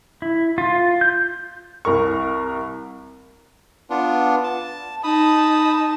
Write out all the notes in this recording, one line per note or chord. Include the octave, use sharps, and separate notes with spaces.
E4
F4
G6
C2 A#4 C#6
B3 D4 F4
A5
D#4 A5 B5 D#6